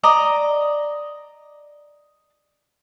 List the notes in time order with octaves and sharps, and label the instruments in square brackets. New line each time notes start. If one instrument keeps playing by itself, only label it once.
[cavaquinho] D5 D#5 A#5